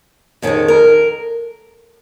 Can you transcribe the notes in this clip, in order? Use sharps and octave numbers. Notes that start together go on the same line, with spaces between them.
F2 D#3 G#3 C#4
A#4